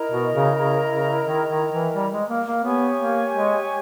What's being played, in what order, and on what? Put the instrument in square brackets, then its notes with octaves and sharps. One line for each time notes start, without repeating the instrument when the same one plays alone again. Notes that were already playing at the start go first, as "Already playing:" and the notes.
Already playing: [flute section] E4 A#4 D#5 A#5
[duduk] B2
C#3
C#3
C#3
D#3
D#3
E3
G3
G#3
A#3
A#3
[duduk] B3 [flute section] G4 C#5 G#5 C#6
[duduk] A#3
G#3